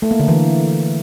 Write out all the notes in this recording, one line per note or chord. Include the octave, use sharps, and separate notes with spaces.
A3
A#3
D3
E3